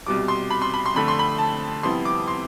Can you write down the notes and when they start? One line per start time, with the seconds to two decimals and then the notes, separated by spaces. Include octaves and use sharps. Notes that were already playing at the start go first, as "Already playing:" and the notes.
0.06 C2 B2 G3 D6
0.28 C6
0.50 B5
0.62 C6
0.74 B5
0.86 C6
0.94 F2 D3 A3 B5
1.08 C6
1.19 B5
1.38 A5
1.83 F2 C3 G3 B3 E4 C6
2.05 D6
2.28 C6